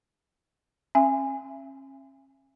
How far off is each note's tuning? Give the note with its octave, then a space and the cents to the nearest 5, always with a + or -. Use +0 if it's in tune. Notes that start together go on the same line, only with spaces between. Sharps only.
C#4 -40 E5 +35 G#5 -15